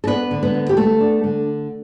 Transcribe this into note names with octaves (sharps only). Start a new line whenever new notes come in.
A4
B3 D4 B4
D3
B3 B4
D2
G4
A3 B3 A4
D4
D3